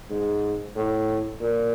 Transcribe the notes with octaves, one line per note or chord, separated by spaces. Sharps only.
G#2
A2
A#2